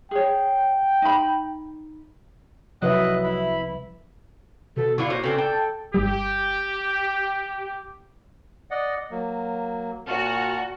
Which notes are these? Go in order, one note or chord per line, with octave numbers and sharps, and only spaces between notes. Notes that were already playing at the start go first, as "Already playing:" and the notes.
G#4 C#5 G5
D#4 B5
C2 F3 F#3 B4 D#5 E5 F#6
E4 B5
B2 A4
D3 D4 E4 F4 C#6
A#2 F#4 C5 C#5
C#3 C4 D4 A4
G5 A5
G1 G3 G4
D5 D#5 F#5
F#3 A#3
A#2 F#4 A5 F6